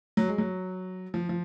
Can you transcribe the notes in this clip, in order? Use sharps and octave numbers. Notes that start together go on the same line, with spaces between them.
F#3
G#3
F#3
F3
F3